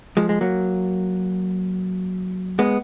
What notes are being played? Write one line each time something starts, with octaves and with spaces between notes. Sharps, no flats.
F3 G#3
G#3
F#3 A#3
G#3 B3